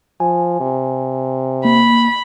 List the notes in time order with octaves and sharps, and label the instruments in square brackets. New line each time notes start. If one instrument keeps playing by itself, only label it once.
[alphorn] F3 [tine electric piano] G#5
[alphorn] C3
[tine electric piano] A#3 [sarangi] B5